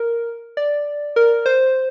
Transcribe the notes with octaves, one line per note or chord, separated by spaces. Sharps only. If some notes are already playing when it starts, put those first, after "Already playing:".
Already playing: A#4
D5
A#4
C5